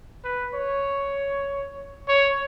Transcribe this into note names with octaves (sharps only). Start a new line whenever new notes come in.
B4
C#5
C#5